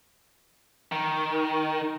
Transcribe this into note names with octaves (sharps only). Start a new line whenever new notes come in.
D#3